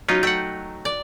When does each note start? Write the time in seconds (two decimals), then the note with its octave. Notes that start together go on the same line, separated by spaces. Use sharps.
0.09 F#3 C#4 D#4 F4
0.23 A3 F#5 G5
0.85 D5